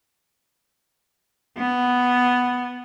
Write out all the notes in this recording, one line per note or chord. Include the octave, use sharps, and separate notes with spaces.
B3